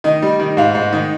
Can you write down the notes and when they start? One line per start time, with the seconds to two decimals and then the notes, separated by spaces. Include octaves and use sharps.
0.04 D#3 D#5
0.22 G3
0.40 D#3
0.57 G#2 F5
0.75 G#2
0.93 D#3